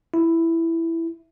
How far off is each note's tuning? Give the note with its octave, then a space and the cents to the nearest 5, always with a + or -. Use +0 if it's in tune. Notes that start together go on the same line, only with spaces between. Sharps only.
E4 +5